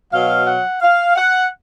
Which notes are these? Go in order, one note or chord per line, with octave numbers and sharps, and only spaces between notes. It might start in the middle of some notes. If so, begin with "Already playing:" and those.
B2 F#3 F5
F#5
F5
F#5